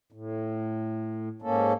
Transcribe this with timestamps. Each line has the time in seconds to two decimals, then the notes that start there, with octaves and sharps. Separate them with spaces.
0.12 A2
1.42 G#2 A#3 C#4 A4